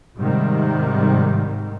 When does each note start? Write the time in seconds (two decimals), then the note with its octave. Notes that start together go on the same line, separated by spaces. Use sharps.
0.17 G#2 C3 D#3 G3